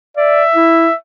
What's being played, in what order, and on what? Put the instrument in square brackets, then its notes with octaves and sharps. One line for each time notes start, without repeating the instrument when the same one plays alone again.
[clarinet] D5 [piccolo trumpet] E5
[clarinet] E4